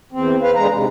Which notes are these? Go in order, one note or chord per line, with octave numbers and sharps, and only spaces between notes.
E2 C4
B4 F5
D3 G#3 A#5
G#2 C3